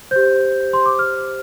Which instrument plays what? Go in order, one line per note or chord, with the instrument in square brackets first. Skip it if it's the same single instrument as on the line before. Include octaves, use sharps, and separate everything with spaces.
[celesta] G4 C5 G6
C6
D6
F6